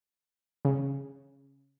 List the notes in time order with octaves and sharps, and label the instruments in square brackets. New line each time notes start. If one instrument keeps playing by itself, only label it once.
[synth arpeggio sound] C#3